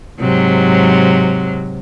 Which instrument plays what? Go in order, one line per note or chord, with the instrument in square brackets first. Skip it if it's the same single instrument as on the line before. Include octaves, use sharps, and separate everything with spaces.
[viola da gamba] G#2 C3 F#3